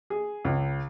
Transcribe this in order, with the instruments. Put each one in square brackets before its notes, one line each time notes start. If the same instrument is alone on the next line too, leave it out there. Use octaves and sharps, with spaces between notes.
[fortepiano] G#4
C#2